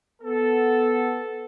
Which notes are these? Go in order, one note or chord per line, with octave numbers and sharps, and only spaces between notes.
B3 A4